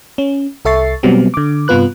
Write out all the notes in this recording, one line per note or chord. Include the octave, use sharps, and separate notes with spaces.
C#4
C2 A4 E5 C#6 A6 C7
B2 F#3 G3 B3 C4
D3 D6
G2 C3 B3 F4 B4 F#6